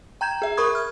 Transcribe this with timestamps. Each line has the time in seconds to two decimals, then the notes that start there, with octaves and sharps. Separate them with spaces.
0.21 G5 A#5 G6 G#6 E7
0.42 G#4 E5
0.57 A#4 B5 C#6 D#6 G#6
0.75 F6